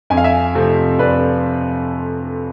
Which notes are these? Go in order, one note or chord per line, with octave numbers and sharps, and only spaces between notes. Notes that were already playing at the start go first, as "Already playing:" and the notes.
F2 G#5
F5
E5 G#5
C3 F3 A3 C4
F2 B4 D5